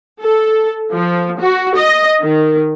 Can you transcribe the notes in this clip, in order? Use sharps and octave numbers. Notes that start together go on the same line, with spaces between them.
A4
F3
F#4
D#5
D#3